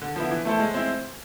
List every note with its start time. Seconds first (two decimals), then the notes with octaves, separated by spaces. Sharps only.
0.02 D3
0.16 F3 B3 E4
0.31 E3
0.45 A3 E4 A4 C5
0.60 G#3
0.74 C4 E4